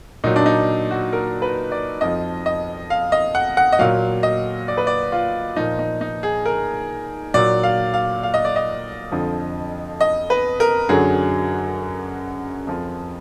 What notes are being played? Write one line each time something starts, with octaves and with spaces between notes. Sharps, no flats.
A#2 F#3 D#4
D4
D#4
F#4
A#4
B4
D5
F2 F3 D#5
D#5
F5
D#5
F#5
F#5
D#5
A#2 F#3 F5
D#5
D5
B4
D5
F4
A#2 F3 D#4
D#4
D#4
G#4
A#4
A#2 F#3 D5
F5
F5
F5
D#5
D5
D#5
F2 D3 F3
D#5
B4
A#4
F#2 D3 F#3 G#4
F2 F3